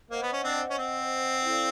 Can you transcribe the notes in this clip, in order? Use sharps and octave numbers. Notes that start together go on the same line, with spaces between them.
A#3 C5 D#5 F#5
B3
C#4
C4 D4
C#4
C4
E4 A4 D5 F5